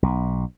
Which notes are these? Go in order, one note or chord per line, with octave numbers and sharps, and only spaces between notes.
B1